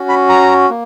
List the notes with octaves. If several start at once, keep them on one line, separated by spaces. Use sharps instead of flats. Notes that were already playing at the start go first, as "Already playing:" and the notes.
Already playing: C#4 F#4
B5
A#5
A#3